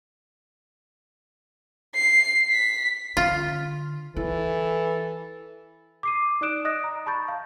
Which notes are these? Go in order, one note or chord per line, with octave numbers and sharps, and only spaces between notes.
C7
B6
D3 F4
E3 E4 A4
D6 C7 D#7
D#4 D5 D#6 F#6 D7 E7
D#5 D#6 F#6 A#6
A#5
A5 B5 C#6 G6 A6
F5